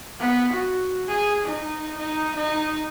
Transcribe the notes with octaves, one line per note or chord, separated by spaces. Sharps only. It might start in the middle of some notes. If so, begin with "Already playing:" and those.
B3
F#4
G#4
D#4
D#4
D#4